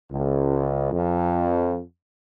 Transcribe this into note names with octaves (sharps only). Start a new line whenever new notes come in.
C#2
F2